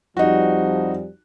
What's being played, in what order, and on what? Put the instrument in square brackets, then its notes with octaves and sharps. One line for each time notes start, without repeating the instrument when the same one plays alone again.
[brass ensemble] F2 F3 G3 [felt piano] D#4 F#4